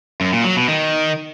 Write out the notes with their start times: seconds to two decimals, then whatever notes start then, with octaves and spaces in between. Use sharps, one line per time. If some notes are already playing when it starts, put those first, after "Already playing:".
0.21 F#2
0.33 A#2
0.45 F#3
0.56 B2
0.68 D#3